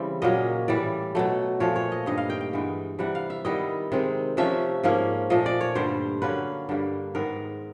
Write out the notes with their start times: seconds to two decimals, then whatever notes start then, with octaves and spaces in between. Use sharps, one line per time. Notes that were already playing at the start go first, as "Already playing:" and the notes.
Already playing: C#3 E3 G3 C4
0.22 A#2 F#3 A#3 C#4 D#5
0.68 A2 E3 G3 D5
1.15 B2 F#3 A3
1.60 A#2 F3 A3 C#5
1.76 C#5
1.92 D#5
2.06 G2 D#3 G3 D#5
2.18 F5
2.30 G5
2.41 G5
2.53 G2 E3 G#3 B3
2.99 C3 E3 G3 F#5
3.15 F5
3.30 E5
3.45 D#3 G3 B3 E4 D#5
3.92 C3 D#3 G#3 C4
4.37 C3 F3 A3 C#4 E5
4.84 G#2 F3 A#3 C#4
5.30 A#2 F3 A3 D#5
5.46 D5
5.61 C#5
5.75 G2 D3 G3 C5
6.22 D3 F#3 A#3 C#4 B4
6.69 G2 D3 G3 A#3
7.15 G#2 D#3 G#3 B3 A#4